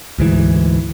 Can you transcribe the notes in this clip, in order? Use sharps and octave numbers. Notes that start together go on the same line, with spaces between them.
D2 G#2 E3